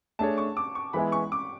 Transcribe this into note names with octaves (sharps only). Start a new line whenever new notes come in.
A3 D4 G#4 C#5 A5
C#6
D6
C#6
E3 G#3 B3 E4 B5
C#6
D6